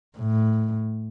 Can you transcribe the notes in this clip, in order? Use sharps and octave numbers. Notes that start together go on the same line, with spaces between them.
A2